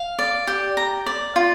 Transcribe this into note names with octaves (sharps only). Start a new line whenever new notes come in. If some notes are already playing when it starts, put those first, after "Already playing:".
Already playing: F5
D5
G4
A#5
D5
F4